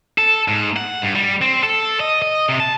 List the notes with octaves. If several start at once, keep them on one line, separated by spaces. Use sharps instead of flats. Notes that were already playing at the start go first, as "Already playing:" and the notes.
A4
G#2
F#5
G2
G3
C4
A4
D#5
D#5
C3
A5